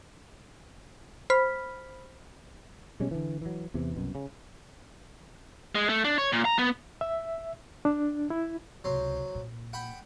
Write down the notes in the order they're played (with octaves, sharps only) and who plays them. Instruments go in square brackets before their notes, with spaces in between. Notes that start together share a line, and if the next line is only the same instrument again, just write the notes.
[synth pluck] C5 B5 F6 B6
[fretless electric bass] B2 G3 G#3 C#4
D3 E3
E3 F#3
E2 C3 E3
C2 F#2 B2
C#3
[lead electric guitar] G#3
A3
D4
C#5
A#2
A#5
B3
[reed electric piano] E5
D4
E4
[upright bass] C#2 C3 [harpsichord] F#3 C5
[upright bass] A#2
[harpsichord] F#5 G5 B5